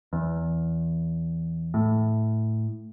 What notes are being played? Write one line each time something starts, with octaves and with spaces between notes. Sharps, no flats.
E2
A2